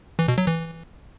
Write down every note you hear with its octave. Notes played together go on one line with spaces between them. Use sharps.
E3
B2
F#3
E3